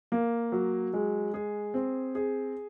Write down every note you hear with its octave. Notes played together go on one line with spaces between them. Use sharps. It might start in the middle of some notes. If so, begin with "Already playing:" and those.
A#3
F#3
G#3
G#4
C4
G#4